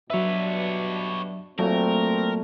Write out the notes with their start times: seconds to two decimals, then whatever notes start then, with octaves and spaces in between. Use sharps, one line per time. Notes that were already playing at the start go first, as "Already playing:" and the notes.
0.10 G2 B2 F#3 D4 B4 C#5 E5
1.59 A#2 F#3 A3 C4 A#4